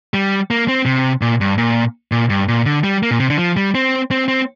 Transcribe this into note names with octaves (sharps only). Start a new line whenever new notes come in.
G3
A#3
C4
C3
A#2
G2
A#2
A#2
G2
A#2
D3
G3
A#3
A#2
C3
D3
F3
G3
C4
C4
C4